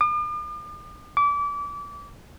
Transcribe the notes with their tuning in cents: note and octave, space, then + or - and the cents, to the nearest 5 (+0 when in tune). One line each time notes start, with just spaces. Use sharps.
D6 +45
D6 -30